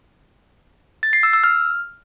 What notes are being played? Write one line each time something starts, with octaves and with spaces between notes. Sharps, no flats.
A6
C7
E6
E6
F6